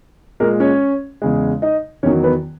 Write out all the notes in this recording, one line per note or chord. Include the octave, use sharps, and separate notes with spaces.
A#2 G#3 A#3 A#4
C#4 C#5
E2 C#3 G#3
D#4 D#5
E2 D#3 F#3 C#4 C#5
B3 B4